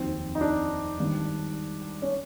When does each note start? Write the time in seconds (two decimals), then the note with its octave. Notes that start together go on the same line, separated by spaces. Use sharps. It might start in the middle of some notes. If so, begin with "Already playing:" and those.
Already playing: F1 D#2 D#3 F#3 C4
0.35 D#4
0.41 D4
0.98 G#1 G2 D#3
2.02 C#4